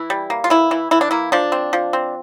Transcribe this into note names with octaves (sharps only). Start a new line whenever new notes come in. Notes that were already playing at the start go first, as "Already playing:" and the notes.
Already playing: E3 E4
G3
A#3
F4
E3 E4
E3
E3 E4
D4
A#3 E4
F3 D4
C4
F3
C4